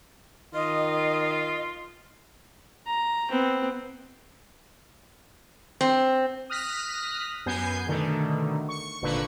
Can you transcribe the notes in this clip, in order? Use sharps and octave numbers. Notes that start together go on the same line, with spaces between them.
D#3 F4 D#5
A#5
B3 C4
C4
D#6 F6 F#6 A#6 B6
F#2 B3 G#5 G6 C7
B2 D3 D#3 A3
C#6
G#1 A#2 D3 B4 C#6